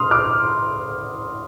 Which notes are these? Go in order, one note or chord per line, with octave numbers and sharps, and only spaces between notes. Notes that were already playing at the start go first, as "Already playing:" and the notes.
Already playing: C6 D#6 F6
D6 F6